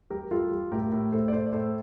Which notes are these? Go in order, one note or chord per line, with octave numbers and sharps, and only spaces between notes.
G3 G4 A#4
G3 F4 A4
G3
A2 G4 A#4
A2
A2 A4 C5
D5
A2 A4 C5
D5
A2 A4 C5